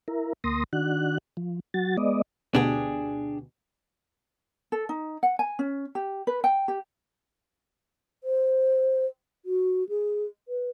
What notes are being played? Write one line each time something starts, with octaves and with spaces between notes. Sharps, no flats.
E4 A#4
D2 A#3 C6 D#6 A#6
D#3 D4 F#4 F#6
F3
F#3 F#4 A6
G#3 B3 D5 D#5
D2 B2 D4 G4 G#4
A4
D#4
F#5
G#5
C#4
G4
B4
G5
G4
C5
F#4
G#4
B4